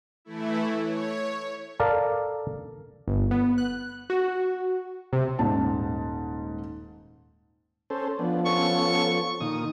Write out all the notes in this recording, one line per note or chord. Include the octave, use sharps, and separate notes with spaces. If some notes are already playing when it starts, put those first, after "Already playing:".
E3 A3 E4
C#5
A4 A#4 D5 F5
G1
B3
F#6
F#4
C3
D#1 G#2 A5
C#4 A4 C5
F3 B3 D4
B3 C#4 A4 C#6
A#2 D#3 D#4 D#6